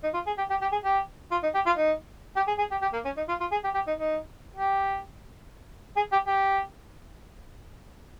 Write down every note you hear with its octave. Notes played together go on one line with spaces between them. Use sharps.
D#4
F4
G#4
G4
G4
G4
G#4
G4
F4
D#4
G4
F4
D#4
G4
G#4
G#4
G4
G4
A#3
C#4
D#4
F4
F4
G#4
G4
G4
D#4
D#4
G4
G#4
G4
G4